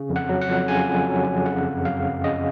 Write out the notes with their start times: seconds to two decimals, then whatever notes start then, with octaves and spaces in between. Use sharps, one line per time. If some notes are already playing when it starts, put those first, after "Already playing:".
Already playing: C#3
0.10 F2
0.16 F#5
0.29 F#3
0.42 F#5
0.48 F2
0.68 C#3 G#5
0.88 F2
1.07 F#3
1.27 F2
1.46 C#3 F#5
1.65 F#2
1.85 F#3 F5
2.05 F#2
2.24 C#3 D#5